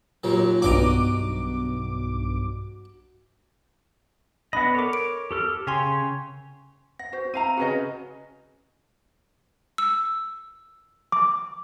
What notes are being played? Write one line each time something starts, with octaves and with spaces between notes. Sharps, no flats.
D#2 A#2 F#3
B1 G2 F#4 D#5 A#5 D6
B3 D4 D#5 B5
A4 A#4 C#5 D6
D7
G4 A4 F6
C#3 C#5 G5 G#5 C6
F#5 A#6
F#4 C5
C4 E4 F5 A#5 D#7
C#3 C#4 F#4 G#4 B4 D#5
E6
D6